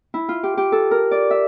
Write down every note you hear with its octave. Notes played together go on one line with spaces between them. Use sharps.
E4
F4
G4
G4
A4
A#4
D5
E5